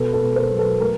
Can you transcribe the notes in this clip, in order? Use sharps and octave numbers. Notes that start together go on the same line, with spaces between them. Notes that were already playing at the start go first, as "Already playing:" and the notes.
Already playing: B2 A4 B4
A4 B4
B2
A#4 C5
F#3
A4 B4
A3 A#4